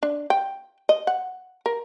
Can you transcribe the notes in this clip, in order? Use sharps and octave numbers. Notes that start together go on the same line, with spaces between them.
D4
G5
D#5
F#5
A#4